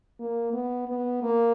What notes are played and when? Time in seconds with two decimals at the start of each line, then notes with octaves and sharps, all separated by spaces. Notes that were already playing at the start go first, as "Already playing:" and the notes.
0.20 A#3
0.53 B3
0.88 B3
1.22 A#3